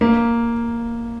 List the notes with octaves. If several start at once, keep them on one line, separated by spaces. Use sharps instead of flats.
A#3